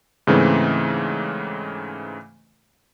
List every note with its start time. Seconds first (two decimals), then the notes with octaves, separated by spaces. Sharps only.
0.27 G#2 C#3 E3 A3 C4